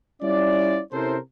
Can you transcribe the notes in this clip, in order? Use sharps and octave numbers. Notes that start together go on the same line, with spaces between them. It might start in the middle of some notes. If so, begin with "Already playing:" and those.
G3 C#4 E4 F4 D5
C3 C#4 E4 A4 A#4 C5